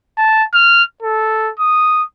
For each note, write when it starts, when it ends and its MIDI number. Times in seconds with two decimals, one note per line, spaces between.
0.18 0.44 81
0.54 0.83 89
1.02 1.51 69
1.59 2.03 87